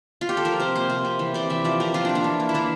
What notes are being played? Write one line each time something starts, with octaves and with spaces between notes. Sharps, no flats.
F4
G4
A4
F3 A#4
C3 C5
A#3 C5
C3
C3
E3
C3 D5
E3 E5
F3 D5
C3 A#4
F3 F4
A#3 D4
D4
E3
A#3
E4
E3 D4